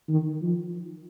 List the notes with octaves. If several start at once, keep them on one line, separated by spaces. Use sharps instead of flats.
D#3
F3